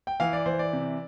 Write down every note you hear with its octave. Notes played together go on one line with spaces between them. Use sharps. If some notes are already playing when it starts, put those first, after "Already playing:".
G5
E3 F5
D5
E3 C5
D5
C3